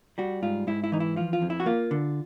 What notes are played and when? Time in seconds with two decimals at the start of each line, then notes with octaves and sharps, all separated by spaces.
0.18 G3 F#4
0.43 G#2 F4
0.67 G#2 E4
0.84 E4
0.92 E3 D#4
1.00 E4
1.16 F3 F4
1.33 F4
1.42 F2
1.50 E4
1.60 F#4
1.66 A#3 F4
1.91 D3